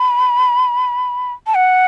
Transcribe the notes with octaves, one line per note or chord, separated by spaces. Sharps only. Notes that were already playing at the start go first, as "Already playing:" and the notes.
Already playing: B5
A5
F#5